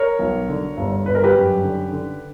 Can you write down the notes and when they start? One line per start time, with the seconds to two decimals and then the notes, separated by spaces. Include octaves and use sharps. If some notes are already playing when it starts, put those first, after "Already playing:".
Already playing: A#4 C#5
0.19 B1
0.48 D3
0.77 G1
1.05 G1 B4
1.15 A#4
1.24 G4 B4
1.35 F#2
1.63 D3
1.91 D3